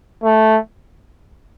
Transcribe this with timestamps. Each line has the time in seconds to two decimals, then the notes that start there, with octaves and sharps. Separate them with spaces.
0.24 A3